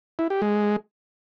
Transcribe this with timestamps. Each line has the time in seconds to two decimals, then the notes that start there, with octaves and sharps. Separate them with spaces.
0.19 E4
0.30 G4
0.42 G#3